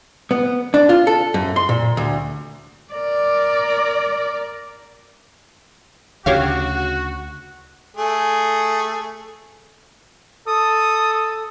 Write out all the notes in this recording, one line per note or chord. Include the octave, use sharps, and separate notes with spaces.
B3
D4
F4
A4
F#2
C6
A#2
D2
A#4 D5
D2 C#3 F#4 G4 C#5 F5
A3 G#4
A4 D#6